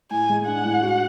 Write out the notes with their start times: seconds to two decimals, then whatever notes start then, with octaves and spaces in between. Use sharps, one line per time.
0.11 A2 G#5
0.29 G#3
0.47 D4 F#5
0.65 A2
0.82 F#4